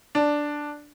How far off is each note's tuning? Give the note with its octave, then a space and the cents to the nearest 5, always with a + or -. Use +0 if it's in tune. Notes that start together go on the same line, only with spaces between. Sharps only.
D4 +0